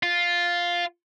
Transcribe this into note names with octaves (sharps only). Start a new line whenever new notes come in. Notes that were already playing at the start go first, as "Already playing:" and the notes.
F4